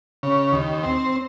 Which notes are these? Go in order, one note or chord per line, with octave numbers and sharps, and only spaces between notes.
C#3
D#2
C4